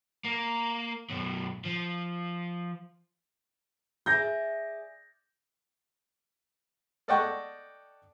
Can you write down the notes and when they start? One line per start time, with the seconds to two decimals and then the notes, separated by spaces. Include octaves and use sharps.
0.24 A#3
1.10 F#2 B2
1.65 F3
4.06 G#4 D5 E5 G6 A#6
7.08 A4 D5 D#5 F#5 G5 C#6